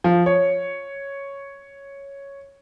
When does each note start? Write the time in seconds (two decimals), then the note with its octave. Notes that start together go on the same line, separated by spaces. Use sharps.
0.04 F3
0.26 C#5